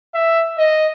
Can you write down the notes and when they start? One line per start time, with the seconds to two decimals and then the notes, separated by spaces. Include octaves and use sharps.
0.14 E5
0.58 D#5